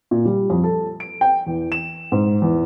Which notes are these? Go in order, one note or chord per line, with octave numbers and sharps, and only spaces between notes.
A#2
G3
F2
A4
D7
G5
E2
E7
G#2
E2